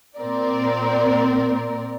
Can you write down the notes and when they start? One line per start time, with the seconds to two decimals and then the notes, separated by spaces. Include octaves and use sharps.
0.17 A#2 C4 A#4 D5